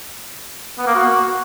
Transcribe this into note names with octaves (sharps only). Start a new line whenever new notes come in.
B3
A#3
F#4